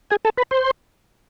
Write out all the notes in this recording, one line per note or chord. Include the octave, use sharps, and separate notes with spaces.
G#4 G#5
A4 A5
B4 B5
C5 C6